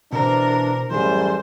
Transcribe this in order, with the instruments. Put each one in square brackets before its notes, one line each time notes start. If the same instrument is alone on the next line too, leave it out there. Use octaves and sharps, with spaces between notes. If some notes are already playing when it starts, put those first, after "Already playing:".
[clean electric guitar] B2 C5 [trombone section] E3 D4 [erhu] A#4
[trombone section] F#2 A2 G3 [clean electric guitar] E3 G#4 [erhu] C5